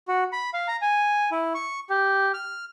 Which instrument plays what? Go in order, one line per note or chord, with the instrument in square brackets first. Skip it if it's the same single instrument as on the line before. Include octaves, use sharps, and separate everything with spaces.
[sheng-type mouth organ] F#4
B5
F5
A#5
G#5
E4
C#6
G4
F6